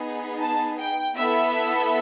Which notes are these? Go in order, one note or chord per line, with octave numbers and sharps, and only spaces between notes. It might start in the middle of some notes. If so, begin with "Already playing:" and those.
Already playing: B3 D#4 G#4
A5
G5
B3 E4 A4 E5